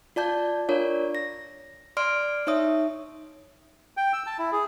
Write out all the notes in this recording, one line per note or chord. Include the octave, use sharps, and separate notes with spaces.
F4 D5 A5 G6
D4 F4 A#4 C#5 D5
A#6
D5 C6 F6 D7
D#4 C#5 E5 D#6
G5
E6
A5
E4
G#4